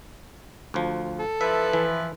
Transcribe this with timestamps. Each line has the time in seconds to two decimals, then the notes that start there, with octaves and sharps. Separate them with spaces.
0.74 D2 F3
1.19 A4
1.41 F3 E4 B4 E5
1.73 E3